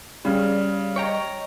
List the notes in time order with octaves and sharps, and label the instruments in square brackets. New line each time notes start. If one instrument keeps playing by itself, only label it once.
[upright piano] C#3 [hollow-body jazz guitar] G3 [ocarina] D5
[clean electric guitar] C#5 G5 A#5 [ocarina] D#5